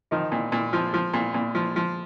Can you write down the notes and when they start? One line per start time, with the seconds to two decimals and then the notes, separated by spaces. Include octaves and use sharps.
0.11 D#3 F3 D#4
0.32 A#2
0.52 A#2
0.73 F3
0.94 F3
1.14 A#2
1.34 A#2
1.55 F3
1.76 F3